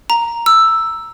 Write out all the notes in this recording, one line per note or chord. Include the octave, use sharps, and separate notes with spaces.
A#5
E6